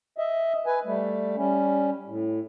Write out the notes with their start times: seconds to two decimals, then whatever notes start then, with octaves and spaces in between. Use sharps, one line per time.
0.18 D#5 E5
0.66 B4 G#5
0.85 G3 A3
1.36 G3 C#4
2.07 A2